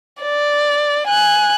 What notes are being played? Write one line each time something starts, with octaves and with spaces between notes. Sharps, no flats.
D5
G#5 F#6